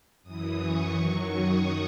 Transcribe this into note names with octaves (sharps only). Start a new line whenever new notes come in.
F#2 E3 D#6
C#6
F#2 D#3 F#3 C#6
D#6